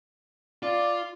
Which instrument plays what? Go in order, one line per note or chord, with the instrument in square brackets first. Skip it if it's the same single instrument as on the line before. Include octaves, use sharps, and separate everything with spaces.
[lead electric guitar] F4 [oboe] D5